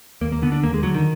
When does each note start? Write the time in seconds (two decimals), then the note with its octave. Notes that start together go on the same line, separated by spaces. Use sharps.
0.21 D#2 A#3
0.32 A#3
0.42 D3 B3
0.52 D4
0.63 D#2 A#3
0.74 G#3
0.83 D3 F#3
0.94 D#3